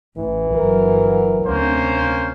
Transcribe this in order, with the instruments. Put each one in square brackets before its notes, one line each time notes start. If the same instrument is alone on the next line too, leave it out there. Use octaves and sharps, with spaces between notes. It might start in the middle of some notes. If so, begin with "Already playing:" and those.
[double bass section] A1 [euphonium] E3
[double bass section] G1 F#3 [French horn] A#4
[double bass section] D2 C3 [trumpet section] A#3 C#4 C5